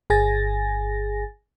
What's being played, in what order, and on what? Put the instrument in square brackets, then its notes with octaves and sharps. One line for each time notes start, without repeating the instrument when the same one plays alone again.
[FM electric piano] G1 G#4 G#5 A6 A#6